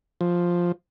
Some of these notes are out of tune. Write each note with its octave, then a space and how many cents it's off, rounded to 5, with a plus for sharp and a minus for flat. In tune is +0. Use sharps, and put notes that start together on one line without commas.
F3 +5